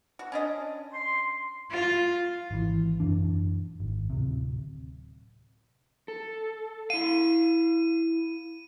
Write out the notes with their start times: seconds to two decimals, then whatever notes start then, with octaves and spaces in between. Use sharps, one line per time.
0.19 F#4
0.32 C#4 D4 D#5
0.93 C6
1.72 F4
2.51 G#1 E3
3.00 F#2 A#2 E3 D4
3.80 G#1
4.10 D1 C3
6.08 A4
6.90 E4 F5 D#7